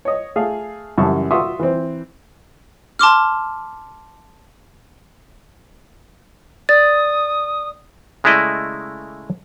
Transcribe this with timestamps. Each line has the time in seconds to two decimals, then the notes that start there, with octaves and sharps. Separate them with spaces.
0.05 C#5 D#5
0.36 A3 G#4 F5
0.98 F#2 C#3 E3 G3 A5 C#6
1.31 F4 F#4 E5 C6 C#6 D#6
1.59 E3 C4
2.99 A5 C6 D6 F6
6.69 D5 D#6 A6
8.24 C#3 G#3 A3 E4 D5 D#5